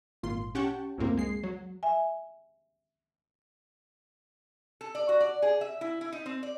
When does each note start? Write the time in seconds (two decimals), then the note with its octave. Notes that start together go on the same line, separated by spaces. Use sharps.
0.23 G#1 A#2 F4 C6
0.55 C#4 G4 F#5 G5 A5 C#6
0.98 C#2 F#2 A2 A#3 C4
1.17 G#3 C7
1.43 F#3
1.83 E5 G#5
4.81 A4
4.95 D5
5.09 F#4
5.20 D5
5.42 G#4
5.61 E5
5.81 E4
6.01 E4
6.12 D#4
6.26 C4
6.43 D5